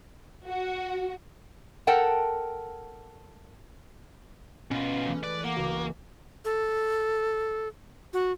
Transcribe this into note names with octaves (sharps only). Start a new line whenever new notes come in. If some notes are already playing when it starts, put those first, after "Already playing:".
F#4
A4 A#4 F#5 G5 A5
B2 C#4 F4 B4
E3 G#3 A3
B4 D5
A#3 F#5 D6
C#2 C#3 F#4
A4
F#4